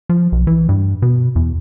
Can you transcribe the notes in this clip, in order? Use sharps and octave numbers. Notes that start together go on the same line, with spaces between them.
F3
B1
E3
G2
B2
E2